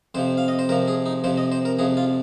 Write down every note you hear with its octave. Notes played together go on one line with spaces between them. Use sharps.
F2 C3 F3 C5
F5
D#5
C5
F2 C3 F3 A#4
G#4
D#4
F2 C3 F3 C5
D#5
C5
A#4
F2 C3 F3 G#4
F4